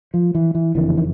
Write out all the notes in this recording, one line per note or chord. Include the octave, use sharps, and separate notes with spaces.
F3
E3
E3
F#1 F2 D3 E3
D#3